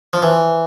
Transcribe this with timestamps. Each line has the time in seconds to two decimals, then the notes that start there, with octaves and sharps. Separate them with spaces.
0.13 F3
0.22 E3